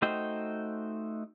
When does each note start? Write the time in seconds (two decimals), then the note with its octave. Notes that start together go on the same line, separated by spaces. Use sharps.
0.02 A3 D#4 F#4 C5 G5